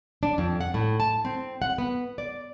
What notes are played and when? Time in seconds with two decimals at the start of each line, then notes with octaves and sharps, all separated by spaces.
0.23 D4
0.38 F2
0.61 F#5
0.74 A2
1.00 A5
1.25 C4
1.62 F#5
1.78 B3
2.18 D5